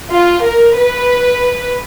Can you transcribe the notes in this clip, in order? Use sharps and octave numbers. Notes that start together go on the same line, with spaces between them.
F4
A#4
B4